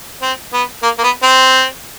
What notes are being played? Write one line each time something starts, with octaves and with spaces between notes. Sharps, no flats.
C4
B3
A#3
A#3
B3
C4